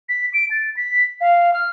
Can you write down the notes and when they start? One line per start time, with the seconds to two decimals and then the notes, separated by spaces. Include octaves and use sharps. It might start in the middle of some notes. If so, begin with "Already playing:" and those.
0.09 B6
0.34 D7
0.51 A6
0.77 B6
1.21 F5
1.54 F6